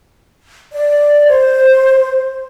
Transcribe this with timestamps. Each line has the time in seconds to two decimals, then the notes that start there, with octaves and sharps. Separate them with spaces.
0.73 D5
1.27 C5